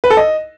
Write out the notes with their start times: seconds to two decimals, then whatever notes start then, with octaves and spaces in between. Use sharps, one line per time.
0.04 B4
0.10 A4
0.17 D#5